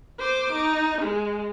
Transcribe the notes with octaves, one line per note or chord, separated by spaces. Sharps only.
C5 D6
D#4
G#3